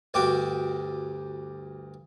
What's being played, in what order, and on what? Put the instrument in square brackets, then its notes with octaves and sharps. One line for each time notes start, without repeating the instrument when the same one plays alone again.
[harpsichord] D2 G2 F#4 G4 D6